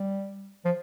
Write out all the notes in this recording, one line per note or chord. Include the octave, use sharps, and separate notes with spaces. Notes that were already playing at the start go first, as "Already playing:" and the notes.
Already playing: G3
F3